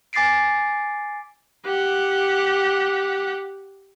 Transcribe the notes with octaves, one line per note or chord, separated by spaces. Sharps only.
G#5 D6 A6 B6 C7 D7
G4 F#5